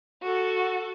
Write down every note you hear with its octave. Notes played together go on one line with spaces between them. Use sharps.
F#4 A4